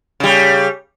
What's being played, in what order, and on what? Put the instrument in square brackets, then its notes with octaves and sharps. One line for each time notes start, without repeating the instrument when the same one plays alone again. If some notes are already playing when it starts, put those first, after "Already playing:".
[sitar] C#3 G3